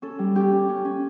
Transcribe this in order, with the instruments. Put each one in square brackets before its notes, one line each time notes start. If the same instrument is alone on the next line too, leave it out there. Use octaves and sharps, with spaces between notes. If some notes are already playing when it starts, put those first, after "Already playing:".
[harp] C#4 A4
G3
C#4 G4
C#4
C#4
C#4